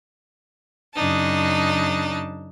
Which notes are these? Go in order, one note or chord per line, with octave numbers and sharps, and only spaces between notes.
F#2 C#3 D4 D#4 A5